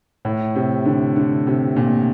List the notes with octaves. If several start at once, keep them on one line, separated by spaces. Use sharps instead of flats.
A2
C3
D3
D3
C3
A#2